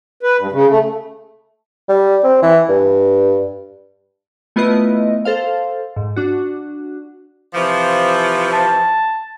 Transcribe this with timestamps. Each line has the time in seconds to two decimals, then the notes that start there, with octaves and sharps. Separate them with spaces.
0.23 B4
0.38 G2
0.52 C#3
0.69 A3
1.89 G3
2.24 C4
2.42 E3
2.69 G2
4.56 A3 B3 E4 F4 B4 D#5
5.25 A4 C5 F5
5.96 G#2
6.16 D4 F#4
7.54 C3 E3 F3
8.53 A5